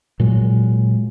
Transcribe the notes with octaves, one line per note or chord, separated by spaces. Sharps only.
A#2 F#3 G#3